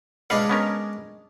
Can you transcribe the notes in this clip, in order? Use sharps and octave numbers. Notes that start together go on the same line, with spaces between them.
G#3 D4 B4 C#5 F5 F#5
B3 C#4 A#4